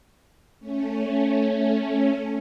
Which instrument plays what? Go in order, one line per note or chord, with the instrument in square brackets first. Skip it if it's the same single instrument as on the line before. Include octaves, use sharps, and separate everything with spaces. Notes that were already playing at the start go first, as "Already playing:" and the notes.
[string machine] A3 C#4